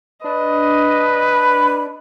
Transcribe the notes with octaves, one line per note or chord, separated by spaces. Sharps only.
D4 B4 D#5
B5